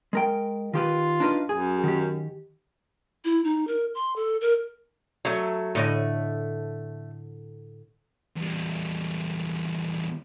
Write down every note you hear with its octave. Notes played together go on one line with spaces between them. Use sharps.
G#3 A#4 G5
D#3 F4 G4 B4
D4 D#4 B4
F#2 G#4
D#3 G4
E4
D#4
A#4
C6
A4
A#4
F#3 A3
A2 D3 A3 D#5
E2 G3